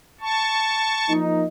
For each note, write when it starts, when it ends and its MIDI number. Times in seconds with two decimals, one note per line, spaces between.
0.21 1.13 81
0.21 1.13 85
1.09 1.45 53
1.09 1.45 58
1.09 1.45 63